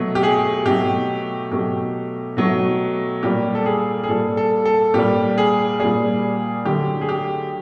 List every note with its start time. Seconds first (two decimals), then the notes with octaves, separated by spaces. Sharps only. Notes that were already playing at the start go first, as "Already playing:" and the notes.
Already playing: B2 F#3 A3
0.15 G4
0.23 G#4
0.65 B2 F#3 A3 G4
1.51 B2 F#3 A3 G4
2.37 B2 F#3 A3
3.23 A#2 G3 G4
3.55 A4
3.66 G#4
4.04 G#4
4.08 A#2 G3 A4
4.37 A4
4.66 A4
4.94 A#2 G3 G4
5.38 G#4
5.80 A#2 G3 G#4
6.65 D3 F#3 A3 G4
7.01 G#4
7.09 G4